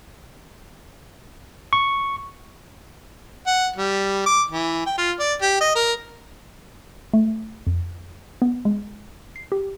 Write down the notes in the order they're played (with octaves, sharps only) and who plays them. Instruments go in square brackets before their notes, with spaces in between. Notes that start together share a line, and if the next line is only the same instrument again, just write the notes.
[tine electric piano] C#6
[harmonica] F#5
G3
D6
E3
G5
F4
D5
G4
D#5
A#4
[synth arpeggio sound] A3
F2
B3
G#3
C7
G4